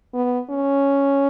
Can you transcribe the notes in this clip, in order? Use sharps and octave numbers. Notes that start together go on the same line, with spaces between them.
B3
C#4